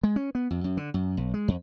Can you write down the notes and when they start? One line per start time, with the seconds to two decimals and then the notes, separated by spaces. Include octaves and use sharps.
0.03 G#3
0.16 C#4
0.35 B3
0.51 F2
0.64 F#2
0.77 D3
0.94 F#2
1.17 B1
1.34 G#3
1.48 F2